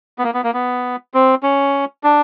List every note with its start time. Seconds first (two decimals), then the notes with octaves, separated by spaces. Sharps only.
0.19 B3
0.24 A#3
0.34 B3
0.44 A#3
0.54 B3
1.14 C4
1.43 C#4
2.04 D4